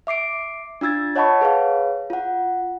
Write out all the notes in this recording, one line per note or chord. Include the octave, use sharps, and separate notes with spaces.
E5 D6 C7 D7
D4 F4 E6 G#6 A6
C#5 D#5 F#5 A5 B5 C#6
G#4 B4 C#5 F5
F4 F#5